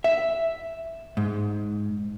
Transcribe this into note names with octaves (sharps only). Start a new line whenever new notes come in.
E5
G#2